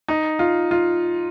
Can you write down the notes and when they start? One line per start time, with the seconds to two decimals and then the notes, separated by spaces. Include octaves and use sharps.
0.08 D#4
0.39 F4
0.71 F4